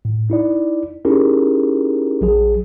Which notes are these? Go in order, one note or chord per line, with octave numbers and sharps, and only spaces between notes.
A2
D#4 E4 D5
C#4 D#4 E4 G4 G#4 A#4
A#1 F#3 G#4